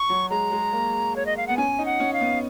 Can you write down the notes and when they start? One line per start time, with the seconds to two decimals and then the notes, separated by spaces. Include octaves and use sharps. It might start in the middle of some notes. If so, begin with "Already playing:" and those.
Already playing: C#6
0.09 F#3
0.30 G#3 A#5
0.52 G#3
0.73 A#3
1.16 C#5
1.26 D#5
1.37 F5
1.47 B3 F#5
1.57 C#4 G#5
1.79 D#4
1.86 F#5
2.00 C#4
2.13 F5
2.21 B3